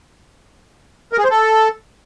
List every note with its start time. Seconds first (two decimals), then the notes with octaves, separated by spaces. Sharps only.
1.13 A#4
1.19 G#4
1.24 C5
1.30 A4